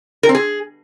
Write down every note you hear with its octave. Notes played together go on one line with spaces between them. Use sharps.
A#4
C4
G#4